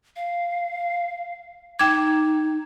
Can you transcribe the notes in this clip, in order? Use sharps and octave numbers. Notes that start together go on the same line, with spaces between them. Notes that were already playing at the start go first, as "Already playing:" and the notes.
F5
D#4 G5 D6 G#6